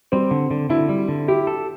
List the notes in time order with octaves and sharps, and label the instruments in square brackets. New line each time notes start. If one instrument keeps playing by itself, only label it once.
[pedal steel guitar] G3 [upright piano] C4
[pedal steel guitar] D3
D3
[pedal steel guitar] D3 [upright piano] E4
[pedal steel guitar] G3
D3
[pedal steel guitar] E4 [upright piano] G4
[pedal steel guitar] A4